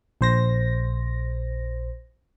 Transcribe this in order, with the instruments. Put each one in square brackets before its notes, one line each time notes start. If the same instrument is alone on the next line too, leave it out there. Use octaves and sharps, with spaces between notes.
[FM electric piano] A#1 C5 A#6